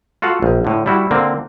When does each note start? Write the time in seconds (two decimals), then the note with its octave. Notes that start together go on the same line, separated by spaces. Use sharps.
0.22 F4 F#4 A4 F5 F#5
0.42 A#1
0.65 A2 D3
0.86 G3 E4 F#4
1.11 D3 A#3 C4